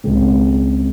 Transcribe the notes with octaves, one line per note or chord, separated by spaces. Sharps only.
C#2 C#3 G#3 C4